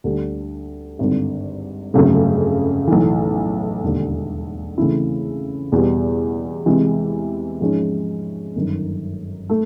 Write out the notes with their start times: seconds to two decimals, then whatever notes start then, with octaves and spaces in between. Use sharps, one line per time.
0.04 D2 D3 G3
0.99 G#1 G2 D3
1.94 G1 F2 C#3 F#3 A3
2.87 B1 A2 E3
3.83 E1 D#2 D3 G3
4.78 C#3 E3 A3 C4 E4
5.72 E2 B2 G3
6.66 C3 E3 G#3
7.61 G#2 F3 G#3 C#4
8.55 G1 F#2 D#3
9.49 A3